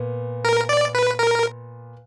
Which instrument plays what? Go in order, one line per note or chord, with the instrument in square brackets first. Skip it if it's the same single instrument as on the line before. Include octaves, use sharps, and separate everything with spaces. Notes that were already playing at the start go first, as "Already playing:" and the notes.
Already playing: [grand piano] A#2 B3
[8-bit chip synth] A#4
D5
B4
A#4